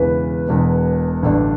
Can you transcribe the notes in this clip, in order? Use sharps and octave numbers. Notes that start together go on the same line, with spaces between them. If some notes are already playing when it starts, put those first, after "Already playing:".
Already playing: E1 E2 C#3 E3 B4
E1 E2 B2
A1 G2 D3 A3 D4